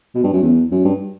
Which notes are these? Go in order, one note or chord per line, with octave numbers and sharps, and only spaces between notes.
B2
G2
F#2
E2
F#2
G2